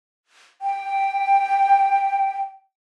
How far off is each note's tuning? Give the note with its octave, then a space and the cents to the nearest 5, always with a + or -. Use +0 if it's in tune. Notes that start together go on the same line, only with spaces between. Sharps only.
G5 +0